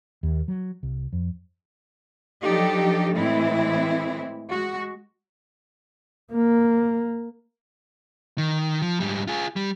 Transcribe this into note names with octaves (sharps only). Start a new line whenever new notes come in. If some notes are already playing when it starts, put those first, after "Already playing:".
D#2
F#3
C2
F2
F3 F#3 D4 D#4 G4 A4
A2 E3 G#3 C4 E4
G#3 F#4
A#3
D#3
F3
G#2 G3
F4 G#4
G3